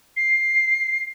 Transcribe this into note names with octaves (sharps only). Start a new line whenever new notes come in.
C7